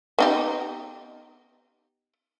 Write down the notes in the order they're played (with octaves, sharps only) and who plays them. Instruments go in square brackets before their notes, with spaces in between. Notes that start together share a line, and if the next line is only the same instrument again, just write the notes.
[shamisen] B3 D#4 G4